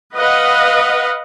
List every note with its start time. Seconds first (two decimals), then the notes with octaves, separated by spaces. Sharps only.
0.15 B4 D#5 F5 F#5